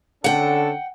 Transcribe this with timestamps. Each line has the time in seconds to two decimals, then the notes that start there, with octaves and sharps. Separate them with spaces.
0.24 D3 C#4 A4 F#5 G5